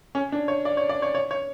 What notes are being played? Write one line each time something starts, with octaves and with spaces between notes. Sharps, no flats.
C#4
D4
C#5
D5
C#5
D5
C#5
C#5
C#5